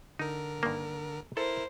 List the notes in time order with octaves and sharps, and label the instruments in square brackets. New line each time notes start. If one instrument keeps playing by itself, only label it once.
[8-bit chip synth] D3 A#4 [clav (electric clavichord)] D#4
[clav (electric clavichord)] G2 D#3 A#3
[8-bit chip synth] E4 A#4 [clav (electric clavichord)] A4 [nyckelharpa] C5